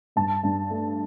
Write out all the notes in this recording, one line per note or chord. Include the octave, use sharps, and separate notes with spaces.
G2 A5
G2
A3